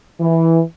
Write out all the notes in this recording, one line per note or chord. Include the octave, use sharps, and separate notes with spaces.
E3